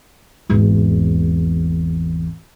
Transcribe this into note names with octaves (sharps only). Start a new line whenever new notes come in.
G#1 E2